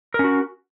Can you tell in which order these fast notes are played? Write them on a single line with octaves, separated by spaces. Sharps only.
A#4 C#4 F#4